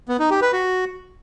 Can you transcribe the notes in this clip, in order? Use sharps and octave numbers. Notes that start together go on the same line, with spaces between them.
B3
D#4
G4
B4
F#4